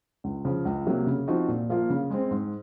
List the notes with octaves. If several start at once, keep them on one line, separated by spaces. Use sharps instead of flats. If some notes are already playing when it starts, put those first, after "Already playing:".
C#2
C#3 F3
C#2
C3 F#3 A#3
C#3
F3 C4 D#4 F#4
A#2
F3 A#3 F4
C#3
G#3 C4
G#2